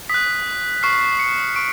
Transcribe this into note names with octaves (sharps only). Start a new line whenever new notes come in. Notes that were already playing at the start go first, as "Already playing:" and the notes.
D#6 F#6 B6
C#6 F6 C7
C#7
C#6 D7